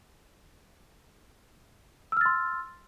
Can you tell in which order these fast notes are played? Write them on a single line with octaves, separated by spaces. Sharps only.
E6 F6 A6 C6